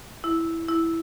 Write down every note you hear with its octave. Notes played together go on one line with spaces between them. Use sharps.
E4
E4